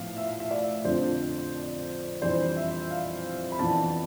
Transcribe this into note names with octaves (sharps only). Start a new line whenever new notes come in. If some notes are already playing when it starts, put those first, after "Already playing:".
Already playing: A2 F3 B3 F5
E5
E5
D5
F2 D3 F3 C4 C5
F2 E3 G3 D4 C5
E5
F5
B5
F2 E3 B3 D4 A5